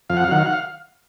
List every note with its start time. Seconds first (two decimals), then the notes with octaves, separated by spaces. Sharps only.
0.10 F2 F5
0.17 F#5
0.24 F5
0.28 D#3 F#3 F#5
0.38 F5
0.46 F#5
0.53 F5